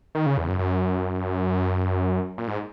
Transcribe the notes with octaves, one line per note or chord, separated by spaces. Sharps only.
D#3
C#3
E2
F#2
F#2
A#2
G#2